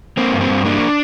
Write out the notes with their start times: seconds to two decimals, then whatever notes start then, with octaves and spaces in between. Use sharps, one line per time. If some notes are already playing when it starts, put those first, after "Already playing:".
0.17 A#3 C4
0.33 G2
0.41 C4
0.49 G2
0.65 A#3 D4